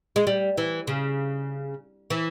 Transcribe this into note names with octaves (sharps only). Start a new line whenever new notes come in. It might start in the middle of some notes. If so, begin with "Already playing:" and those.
G#3
G3
E3
C#3
E3